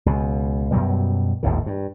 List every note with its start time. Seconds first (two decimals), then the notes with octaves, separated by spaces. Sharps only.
0.06 C#2 B2
0.72 F#2 B2 F#3 G3
1.43 G#1 D#2 A2 D#3
1.66 G2